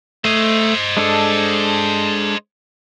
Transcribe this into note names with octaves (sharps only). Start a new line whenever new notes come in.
A3 C5 D#5
G#3 D4 A4